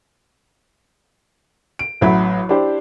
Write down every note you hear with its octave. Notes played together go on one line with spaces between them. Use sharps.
D7
A1 F#3 E5 B5
D4 E4 G4 C5